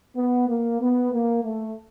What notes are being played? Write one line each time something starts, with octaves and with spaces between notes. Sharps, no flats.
B3
A#3
B3
A#3
A3